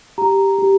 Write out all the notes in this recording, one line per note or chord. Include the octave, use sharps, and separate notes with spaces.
G4 A#5
G4